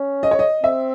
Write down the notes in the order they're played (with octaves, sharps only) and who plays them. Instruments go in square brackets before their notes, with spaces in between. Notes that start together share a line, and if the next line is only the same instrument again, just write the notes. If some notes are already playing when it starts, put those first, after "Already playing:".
Already playing: [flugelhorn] C#4
[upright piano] D#5
C#5
D#5
[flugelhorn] C4 [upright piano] E5